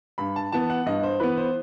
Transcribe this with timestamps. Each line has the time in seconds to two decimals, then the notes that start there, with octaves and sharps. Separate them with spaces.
0.18 G2 B5
0.36 A5
0.52 E3 B3 A5
0.70 F#5
0.86 G2 D#5
1.03 C5
1.20 E3 B3 B4
1.37 C5